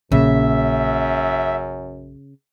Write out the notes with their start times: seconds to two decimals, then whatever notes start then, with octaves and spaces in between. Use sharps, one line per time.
0.12 A#1 F#2 A#2 C#3 A#3 E5